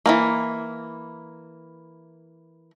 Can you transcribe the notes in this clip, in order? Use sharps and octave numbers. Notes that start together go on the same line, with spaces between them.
E3 A3 A#3